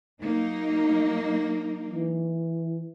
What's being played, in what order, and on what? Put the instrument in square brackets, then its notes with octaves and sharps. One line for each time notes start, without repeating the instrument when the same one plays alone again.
[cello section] F#3 A#3 D#4
[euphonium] E3